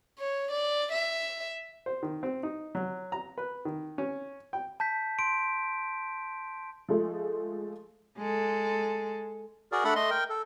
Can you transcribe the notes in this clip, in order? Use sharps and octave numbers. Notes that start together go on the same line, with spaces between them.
C#5
D5
E5
C5
D#3
C4
D#4
F#3
A#5
B4
D#3
C#4
G5
A5 G6 B6
C6 D7
F3 G#3 A3
G#3 A4
F#4 G#4 A#4 D5
A3 D4 A4 D5 F#5 B5
A3 D#5 C6
A#4 G5
A4